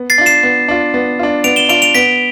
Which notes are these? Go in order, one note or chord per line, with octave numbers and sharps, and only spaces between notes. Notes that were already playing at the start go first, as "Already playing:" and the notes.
Already playing: B3
A6 C7
D4 F4
C7 E7
B3
D4 F4
B3
D4 F4
B3 D7 F7
E7 G7
D4 F4 D7 F7
D7 F7
B3 B6 D7